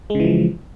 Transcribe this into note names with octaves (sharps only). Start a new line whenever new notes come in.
C#3 E3 F3 G#3